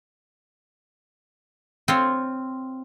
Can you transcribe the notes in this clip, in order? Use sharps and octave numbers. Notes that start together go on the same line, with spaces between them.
C4 F4 C#5